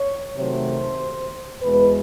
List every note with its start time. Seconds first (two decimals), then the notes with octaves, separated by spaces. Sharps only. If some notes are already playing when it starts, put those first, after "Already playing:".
Already playing: C#5
0.37 C3 D#3 F#3 A3 C5
1.62 E2 B2 G#3 B4